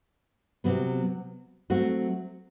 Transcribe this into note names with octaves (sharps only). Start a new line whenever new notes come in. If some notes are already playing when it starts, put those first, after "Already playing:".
C3 F#3 B3
F#3 A3 C4 F#4